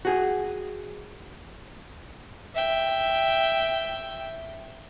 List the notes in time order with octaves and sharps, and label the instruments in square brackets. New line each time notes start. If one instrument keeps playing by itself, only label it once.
[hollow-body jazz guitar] F#4 G#4
[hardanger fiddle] E5 G5